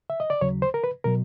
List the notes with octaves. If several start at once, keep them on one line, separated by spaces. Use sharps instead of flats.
E5
D#5
D5
D#2 C#3 F#3 C#5
C5
A#4
B4
B2 F#3 A#4